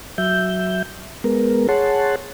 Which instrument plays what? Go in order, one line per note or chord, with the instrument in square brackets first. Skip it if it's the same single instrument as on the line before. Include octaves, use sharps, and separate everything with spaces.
[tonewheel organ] F#3 E5 G6
G#3 B3 A#4
G#4 C#5 F#5 A5 C6